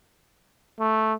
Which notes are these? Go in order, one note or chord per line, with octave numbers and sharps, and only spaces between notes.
A3